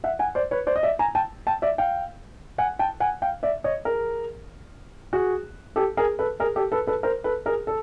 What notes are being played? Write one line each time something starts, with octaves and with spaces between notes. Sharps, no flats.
E5 F#5
F#5 G#5
C5 D5
B4 C#5
C5 D5
D#5
D5 E5
G#5 A#5
G5 A5
G5 A5
D5 E5
F5 G5
F#5 G#5
G5 A5
F#5 G#5
F5 G5
D5 E5
C#5 D#5
G#4 A#4
F#4 G#4
G4 A4
G#4 A#4
A4 B4
G#4 A#4
G4 A4
A4 B4
A4 B4
A#4 C5
A4 B4
G#4 A#4
A4